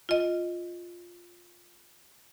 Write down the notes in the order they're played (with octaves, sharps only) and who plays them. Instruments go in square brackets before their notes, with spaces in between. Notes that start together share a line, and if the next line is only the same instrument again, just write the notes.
[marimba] F4 D#5